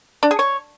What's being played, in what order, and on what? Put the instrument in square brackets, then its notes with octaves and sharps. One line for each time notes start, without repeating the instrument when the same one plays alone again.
[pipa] D4
G#4
C#5